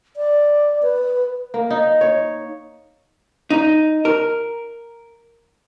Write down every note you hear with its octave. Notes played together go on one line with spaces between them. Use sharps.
D5
B4
A#3
D#4
C#5
D#4
A#4